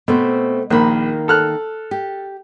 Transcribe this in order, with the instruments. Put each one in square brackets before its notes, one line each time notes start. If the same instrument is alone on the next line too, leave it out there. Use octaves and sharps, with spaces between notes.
[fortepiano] B2 [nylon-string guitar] A3 C4 C5
[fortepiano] A#1 B5 [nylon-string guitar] D#3 A#3
[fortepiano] A4 F6 F#6
[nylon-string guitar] G4